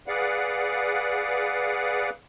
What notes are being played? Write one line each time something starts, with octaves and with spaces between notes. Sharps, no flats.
G#4 B4 D5 F5 F#5